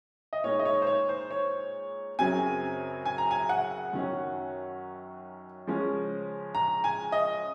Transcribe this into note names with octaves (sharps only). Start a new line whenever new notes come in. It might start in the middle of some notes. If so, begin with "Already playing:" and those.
D#5
A#2 G#3 D#4 C#5
D#5
C#5
C5
C#5
C5
C#5
F#2 C#3 F#3 C4 G#5
G#5
A#5
G#5
F#5
F#2 D#3 F#3 C#4
C#3 F3 G#3 C#4
A#5
G#5
D#5